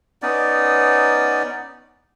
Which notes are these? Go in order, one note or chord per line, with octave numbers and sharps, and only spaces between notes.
B3 C#4 D#4 D5